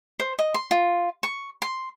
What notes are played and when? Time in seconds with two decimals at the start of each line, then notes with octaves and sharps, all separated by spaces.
0.20 C5
0.39 D#5
0.54 C6
0.71 F4
1.23 C#6
1.62 C6